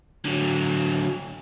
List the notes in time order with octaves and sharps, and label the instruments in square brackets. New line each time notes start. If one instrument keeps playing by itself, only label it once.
[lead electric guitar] D3 F#3